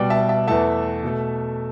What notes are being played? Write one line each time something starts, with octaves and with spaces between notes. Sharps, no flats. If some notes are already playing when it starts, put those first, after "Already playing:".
Already playing: B2 G3 D5 G5
E5 A5
E5 A5
E2 E3 A3 E5 A5
B2 A3